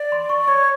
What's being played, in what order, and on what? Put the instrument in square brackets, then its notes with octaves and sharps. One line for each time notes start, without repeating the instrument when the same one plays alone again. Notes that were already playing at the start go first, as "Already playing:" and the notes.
Already playing: [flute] D5
[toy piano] C6
C#6
[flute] C#5 [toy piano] C#6